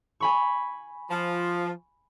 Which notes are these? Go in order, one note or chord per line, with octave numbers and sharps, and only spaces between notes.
G#5 B5 C#6
F3